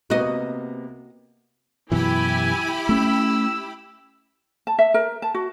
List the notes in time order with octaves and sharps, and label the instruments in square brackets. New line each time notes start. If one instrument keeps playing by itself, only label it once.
[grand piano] C3 A#3 B3 [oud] F#4 D#5
[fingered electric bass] F#2 B2 E3 [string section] E4 G4 B5 [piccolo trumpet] G#5
[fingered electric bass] A3 C#4 [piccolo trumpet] E6
[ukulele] A5
E5
A#4
A5
F#4